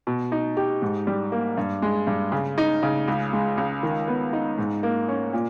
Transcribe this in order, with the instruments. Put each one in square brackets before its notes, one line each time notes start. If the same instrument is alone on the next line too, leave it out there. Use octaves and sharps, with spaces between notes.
[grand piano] B2
D#4
G4
G#2
G3
A#3
G2
G#3
G2
C#3
D#4
C#3
C#2
G#3
C#2
D#3
B3
D#4
G#2
A#3
C#4
A#2